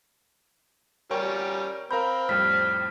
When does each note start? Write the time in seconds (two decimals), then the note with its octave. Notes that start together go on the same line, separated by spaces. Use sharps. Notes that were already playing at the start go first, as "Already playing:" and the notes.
1.11 G3 C#4 A#4 G5 C#6
1.91 C4 A#4 F5 A#5 B5 G6
2.29 F2 A2 G3 C5 F6 B6